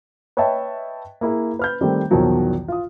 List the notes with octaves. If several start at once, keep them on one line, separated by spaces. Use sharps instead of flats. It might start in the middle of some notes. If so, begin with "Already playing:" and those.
B4 C#5 D#5 E5 G5 A5
A#3 E4 G#4
B4 F6 G6
D#3 G3 A3 C4
B1 E2 B2 D#3 F3 F#3
F4 D#6